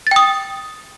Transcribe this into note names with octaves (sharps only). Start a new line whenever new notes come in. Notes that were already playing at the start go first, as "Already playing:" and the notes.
G5 D#6 A6